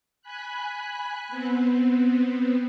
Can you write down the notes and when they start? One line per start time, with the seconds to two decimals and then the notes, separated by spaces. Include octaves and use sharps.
0.22 G#5 B5 F#6
1.29 B3 C4